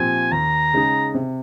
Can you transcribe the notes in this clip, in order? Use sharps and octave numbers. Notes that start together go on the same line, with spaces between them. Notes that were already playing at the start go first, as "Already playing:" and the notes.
Already playing: A#2 F3 C4 G4 G#5
D#2 A#5
C#3 G#3 D#4 G#4
C3